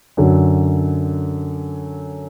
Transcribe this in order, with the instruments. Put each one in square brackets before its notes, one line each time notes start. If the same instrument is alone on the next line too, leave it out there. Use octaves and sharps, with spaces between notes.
[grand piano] F#2 D3 F#3